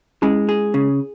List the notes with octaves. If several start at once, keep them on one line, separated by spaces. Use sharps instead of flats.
G#3 C#4 E4
G#4
C#3